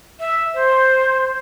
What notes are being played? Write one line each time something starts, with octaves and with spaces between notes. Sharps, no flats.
E5
C5